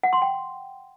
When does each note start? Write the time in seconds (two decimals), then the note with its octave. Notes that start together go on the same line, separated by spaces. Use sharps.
0.03 F#5
0.13 C6
0.22 G5